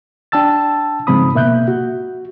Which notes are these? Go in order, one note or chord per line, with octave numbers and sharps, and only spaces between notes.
D4 G5 A5 E6 A6
G#2 C#3 F3 C4 B5 D#6
B2 A#3 E5 F#6 G6
F#4